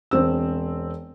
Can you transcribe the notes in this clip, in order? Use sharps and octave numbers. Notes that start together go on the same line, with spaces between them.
E1 C4 E6